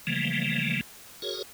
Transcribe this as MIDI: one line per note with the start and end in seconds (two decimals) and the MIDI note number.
0.07 0.81 49
0.07 0.81 52
0.07 0.81 53
0.07 0.81 55
0.07 0.81 57
0.07 0.81 58
1.22 1.43 66
1.22 1.43 68
1.22 1.43 70
1.22 1.43 73